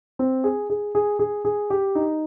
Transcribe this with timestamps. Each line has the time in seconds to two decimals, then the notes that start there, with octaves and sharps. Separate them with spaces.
0.19 C4
0.44 G#4
0.70 G#4
0.95 G#4
1.19 G#4
1.45 G#4
1.70 G4
1.95 D#4